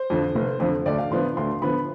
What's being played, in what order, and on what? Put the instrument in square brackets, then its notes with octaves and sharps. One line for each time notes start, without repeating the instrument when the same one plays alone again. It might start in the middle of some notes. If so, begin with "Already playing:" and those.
Already playing: [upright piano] C5
F2 D3 F3
F1
F2 D3 F3
D2 D5
F5
D3 F3 B3 C6
D2 C6
D3 F3 B3 B5